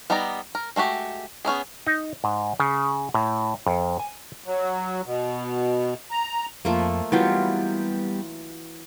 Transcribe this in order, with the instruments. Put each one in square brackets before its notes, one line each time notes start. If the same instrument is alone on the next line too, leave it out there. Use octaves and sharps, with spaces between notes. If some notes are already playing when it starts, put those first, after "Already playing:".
[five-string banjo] G3 B3 D#4 D5 A#5
A#4
G#3 A3 F#4 G4
B3 C#4 E4 G#4
[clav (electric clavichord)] D#4
G#2
C#3
A2
F2
G#5
[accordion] F#3
B2
A#5
[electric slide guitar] F2 [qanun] F3 A3 A#3
[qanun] E3 F#3 F4 [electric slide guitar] G3 B3 G4